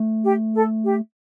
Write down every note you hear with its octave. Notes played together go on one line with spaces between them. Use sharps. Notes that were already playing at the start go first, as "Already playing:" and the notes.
Already playing: A3
G4
A4
G4